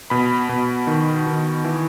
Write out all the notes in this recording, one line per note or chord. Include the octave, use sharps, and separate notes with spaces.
B2 B5
B2
D#3
D#3
E3